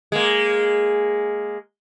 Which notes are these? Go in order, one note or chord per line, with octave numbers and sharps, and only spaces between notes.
G#3 A#3